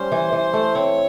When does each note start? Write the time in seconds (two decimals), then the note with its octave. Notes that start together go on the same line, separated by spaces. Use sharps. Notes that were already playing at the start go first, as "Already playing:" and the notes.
Already playing: G3 C#4 C5
0.12 E3
0.33 E3
0.53 A3
0.75 C4 C#5